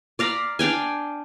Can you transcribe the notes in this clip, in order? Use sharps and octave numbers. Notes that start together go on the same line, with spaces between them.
D5 F5 A#5 B5
D4 F5 G5 G#5